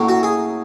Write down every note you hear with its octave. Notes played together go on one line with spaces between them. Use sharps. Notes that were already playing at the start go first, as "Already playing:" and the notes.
Already playing: A2 F#3 A#3 C#4
F#4
G#4